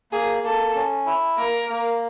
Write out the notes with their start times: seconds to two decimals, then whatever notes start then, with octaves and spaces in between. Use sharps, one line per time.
0.12 A#3 G#4
0.43 A#3 A4
0.75 C#4
1.06 E4
1.37 A#3 A#4
1.70 A#3